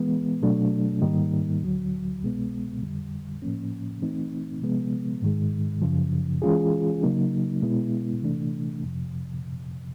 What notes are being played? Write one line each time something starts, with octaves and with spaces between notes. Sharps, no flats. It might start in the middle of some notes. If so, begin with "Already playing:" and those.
Already playing: E3 G#3 B3
B2 F#3 A3 D4
G#2 D#3 G3 A#3 D#4
D2 D3 F#3
C2 B2 G#3 B3
F2 D3 G3
A2 F3 A#3 C#4
E3 A3 C4 D#4
C3 F3 G#3 B3
G#2 D#3 G#3
F#2 C#3 F3
E3 G#3 C#4 F4 G#4
C#3 F#3 A#3 D#4
B2 G#3 B3 E4
C3 E3 A3 D4
F2 C3 F3